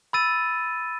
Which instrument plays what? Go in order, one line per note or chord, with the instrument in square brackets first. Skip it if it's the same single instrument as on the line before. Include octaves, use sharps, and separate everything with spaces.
[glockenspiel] B5 E6 A6 D#7